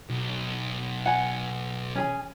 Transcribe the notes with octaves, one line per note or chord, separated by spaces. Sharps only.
B1
F#5 G#5
C#4 G#4 G#5